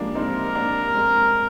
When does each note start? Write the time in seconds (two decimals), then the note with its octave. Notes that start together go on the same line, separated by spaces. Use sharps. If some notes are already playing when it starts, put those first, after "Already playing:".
Already playing: F3 G3 G#3 A#3 D4
0.15 C4 D#4 A#4
0.55 A#3 D4
0.95 G#3 C4